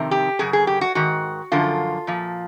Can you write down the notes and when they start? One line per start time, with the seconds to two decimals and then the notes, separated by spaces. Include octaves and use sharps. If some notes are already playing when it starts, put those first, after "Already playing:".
Already playing: F2 C3 D#3
0.11 G4
0.39 F#2 C#3 G#4
0.53 G#4
0.67 G4
0.81 F#4
0.95 G#2 D#3 F#4
1.52 F#2 D3 F3 F4
2.07 A#2 F3